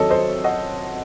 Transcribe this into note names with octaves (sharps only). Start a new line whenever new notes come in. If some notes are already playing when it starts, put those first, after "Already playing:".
Already playing: C3 D#3 F#3 A4 C#5 D#5
C5 D#5
D#5 F#5